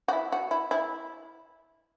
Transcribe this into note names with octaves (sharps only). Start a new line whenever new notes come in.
F#4
E4
F#4
E4
E4